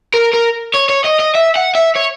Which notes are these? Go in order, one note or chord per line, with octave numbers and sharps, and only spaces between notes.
A#4
A#4
C#5
C#5
D#5
D#5
E5
F#5
E5
C#5